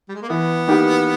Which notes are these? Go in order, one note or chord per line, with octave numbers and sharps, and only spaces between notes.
G3
G#3
A#3
E3 B3
A#3 D#4 G4